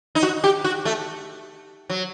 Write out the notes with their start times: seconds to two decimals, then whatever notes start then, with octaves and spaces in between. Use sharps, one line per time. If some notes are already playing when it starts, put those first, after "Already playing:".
0.15 D#4
0.23 F#4
0.44 G4
0.64 F#4
0.85 A3
1.90 F#3